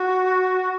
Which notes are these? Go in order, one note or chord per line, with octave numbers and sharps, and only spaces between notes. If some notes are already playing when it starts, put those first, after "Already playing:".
Already playing: F#4